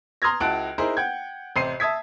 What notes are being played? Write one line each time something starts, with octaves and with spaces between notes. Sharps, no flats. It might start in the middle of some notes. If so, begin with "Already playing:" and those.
A#5 C6 D#6 F6 G#6 A#6
C#2 E4 F#4 A5 F#6 D7
D#4 E4 G#4 A#4 C5
F#5 G5 G6 G#6
A1 C3 C5 C7 D#7
E5 A5 D#6 G#6 B6